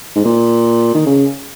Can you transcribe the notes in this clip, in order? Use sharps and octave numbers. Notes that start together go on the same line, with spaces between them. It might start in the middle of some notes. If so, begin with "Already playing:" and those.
G#2
A#2
D#3
C#3